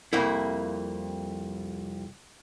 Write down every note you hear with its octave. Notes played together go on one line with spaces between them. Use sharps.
C2 F2 A#3 E4